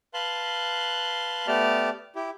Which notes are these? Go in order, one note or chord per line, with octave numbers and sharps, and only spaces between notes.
B4 F5 A5 C6 F#6
A3 B3 G4 D5 A5 F6
E4 G4